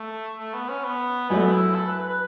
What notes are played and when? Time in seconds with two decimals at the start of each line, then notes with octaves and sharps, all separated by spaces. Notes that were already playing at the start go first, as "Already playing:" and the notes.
Already playing: A3
0.38 A3
0.53 B3
0.69 C#4
0.84 B3
1.30 F#2 F#3 A3 B3
1.52 E4
1.75 A4
1.86 B4
1.98 B4
2.09 B4